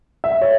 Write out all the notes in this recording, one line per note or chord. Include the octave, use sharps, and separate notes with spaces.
E5
C#5